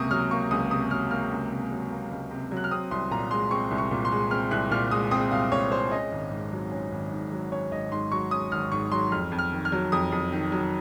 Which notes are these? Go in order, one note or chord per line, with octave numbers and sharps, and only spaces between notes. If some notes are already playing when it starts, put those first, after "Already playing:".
Already playing: C#2 C3 A#3 C#6 D#6
F#3 F6
A#3 C#6
C#2 D#6
C3 D#6
F#3 F6
A#3 F6
C#2
C3
F#3
A#3
C#2
C3
F#3
F#6
F6
C4 D#6
C2 C6
A#2 A#5
G#3 C6
C4 C#6
C2
C#6
A#2
C6
G#3
C4 F6
C2 F#6
A#2 F6
G#3 D#6
C4 D#6
C2 F5
A#2 C#5
G#3 C5
C#4 D#5
G#1
G#2
F#3
C#4
G#1
G#2
F#3
C#4 C#5
G#1 D#5
G#2 C6
F#3 C#6
C#4 D#6
G#1 F6
G#2 C#6
F#3 C6
F2 F6
F2
F6
D#3
F6
F#3
F2 D#6
F2
D#3
F#3